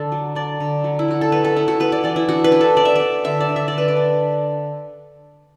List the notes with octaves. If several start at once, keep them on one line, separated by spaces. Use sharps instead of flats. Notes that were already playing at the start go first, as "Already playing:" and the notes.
Already playing: D3 D4 A4
F#3
D4 D5
D3
F#3
E4
F#3 F#4
A4
B3 B4
A4
B3 E4
F#4
B3 B4
D5
E3 D5
E4
D4 F#4
B4
D4
A4
B3 D5
E5
D4 D5
D3 E5
D5
D3
E5
D3 D5
B4
D5
D4